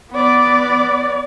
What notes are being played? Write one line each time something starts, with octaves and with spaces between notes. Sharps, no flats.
B3 D5